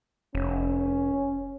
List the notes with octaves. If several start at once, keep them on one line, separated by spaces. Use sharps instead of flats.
F1 C#4